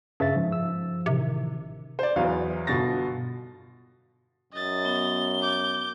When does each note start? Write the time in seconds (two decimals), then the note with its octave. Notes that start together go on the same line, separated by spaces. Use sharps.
0.20 G2 C#3 E5 A6
0.36 G#2 F3
0.52 E6
1.06 A1 C3 D#3
1.99 C5 D5
2.16 E2 E3 F#3 B3 F5
2.67 G1 B2 F4 A6 A#6
4.53 F#2 D#5 A6
4.85 B3 G7
5.41 D6 G6